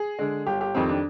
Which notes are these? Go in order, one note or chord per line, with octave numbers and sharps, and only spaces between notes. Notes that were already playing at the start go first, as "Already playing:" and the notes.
Already playing: G#4
D3 G#3
G1 G4
G4
F2 D#3 G3 C4
D4